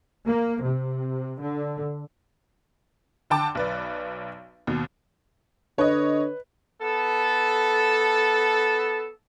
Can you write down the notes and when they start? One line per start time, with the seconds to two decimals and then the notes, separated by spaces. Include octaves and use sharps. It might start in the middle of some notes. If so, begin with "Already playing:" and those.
0.26 A#3
0.63 C3
1.39 D3
3.30 D3 G5 A5 D6
3.55 B1 B4 D5
4.67 D#2 B2
5.78 D3 B4 C#5 D#5
6.81 B3 A4